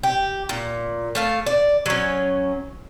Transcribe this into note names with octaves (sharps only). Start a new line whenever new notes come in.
G4
A#2
A3 F5 A5
D5
F#3 C#4